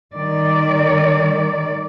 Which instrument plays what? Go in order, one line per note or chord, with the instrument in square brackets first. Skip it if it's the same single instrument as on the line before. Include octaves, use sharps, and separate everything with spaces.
[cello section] D#3 G3 D5